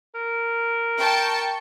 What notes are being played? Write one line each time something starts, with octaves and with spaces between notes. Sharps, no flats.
A#4
G5 A5 C#6